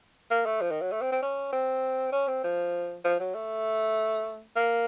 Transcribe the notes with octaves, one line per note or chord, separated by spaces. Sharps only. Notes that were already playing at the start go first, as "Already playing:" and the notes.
A#3
A3
F3
D#3
F#3
A3
C4
C4
C#4
C4
C#4
C4
F3
F3
F#3
A3
A#3